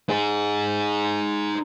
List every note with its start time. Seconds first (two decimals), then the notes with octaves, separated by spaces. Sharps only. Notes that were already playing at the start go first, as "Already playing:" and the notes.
0.10 D#4 G#4